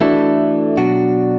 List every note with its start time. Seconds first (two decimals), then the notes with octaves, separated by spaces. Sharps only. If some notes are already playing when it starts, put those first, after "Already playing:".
0.01 E3 A3 D4 E4 F#4 A4
0.77 B2 F#3 D4 F#4